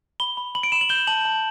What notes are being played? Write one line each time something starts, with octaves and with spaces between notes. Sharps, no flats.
B5 G7
B5
B5 F#7
D7
B5 E7
F#7
G6 G7
A5 F#7
A5